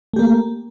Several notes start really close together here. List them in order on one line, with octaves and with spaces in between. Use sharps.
A3 G4 A#3